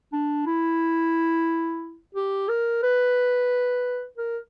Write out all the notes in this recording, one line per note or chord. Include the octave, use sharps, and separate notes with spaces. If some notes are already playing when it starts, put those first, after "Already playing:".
D4
E4
G4
A#4
B4
A#4